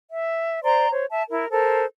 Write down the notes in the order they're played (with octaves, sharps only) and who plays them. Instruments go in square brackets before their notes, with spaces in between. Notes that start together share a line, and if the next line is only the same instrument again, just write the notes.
[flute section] E5
C5 D5 A#5 C6
C5 C#5
E5 A5
E4 A#4
A4 A#4 C5